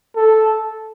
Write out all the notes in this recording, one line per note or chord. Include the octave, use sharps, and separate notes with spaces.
A4